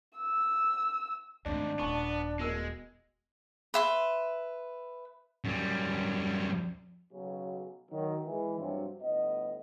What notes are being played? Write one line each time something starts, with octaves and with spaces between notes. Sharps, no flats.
E6
D#2 G#2 A3 C4 D4
D#1 B3 A5 C#6
B2 G#3 A#4 E6
B4 E5 C6
F#2 G3
B1 C#3 F#3
D#3 F#3
E3 G#3
G2 C3 F3 F#3
G1 A2 B3 D#5